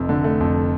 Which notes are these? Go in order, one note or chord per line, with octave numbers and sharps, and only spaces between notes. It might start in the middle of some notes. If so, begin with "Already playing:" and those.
Already playing: F1 F2
D3
A3
F2